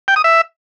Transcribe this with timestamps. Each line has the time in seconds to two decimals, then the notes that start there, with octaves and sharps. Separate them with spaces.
0.08 G5
0.16 D#6
0.24 E5